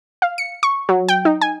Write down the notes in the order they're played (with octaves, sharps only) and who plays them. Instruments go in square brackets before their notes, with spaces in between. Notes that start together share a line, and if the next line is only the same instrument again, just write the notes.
[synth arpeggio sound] F5
C#7
C#6
F#3
G5
D#4
G#5